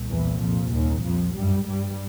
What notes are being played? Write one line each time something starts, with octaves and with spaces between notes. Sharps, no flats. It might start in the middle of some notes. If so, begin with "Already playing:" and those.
Already playing: C2 A#2
E2 E3
F2 F3
D#2 D#3
F2 F3
G2 G3
G2 G3